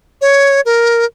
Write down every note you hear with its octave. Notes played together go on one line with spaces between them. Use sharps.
C#5
A#4